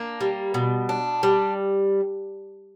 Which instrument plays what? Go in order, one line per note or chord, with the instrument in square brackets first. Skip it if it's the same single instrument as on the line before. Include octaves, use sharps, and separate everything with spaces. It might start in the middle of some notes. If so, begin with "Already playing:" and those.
Already playing: [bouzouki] A#3 D4
G3
B2
D4
G3